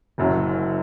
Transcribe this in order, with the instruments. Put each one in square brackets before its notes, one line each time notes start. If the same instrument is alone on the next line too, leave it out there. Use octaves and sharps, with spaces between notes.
[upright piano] F#1 F#2 F#3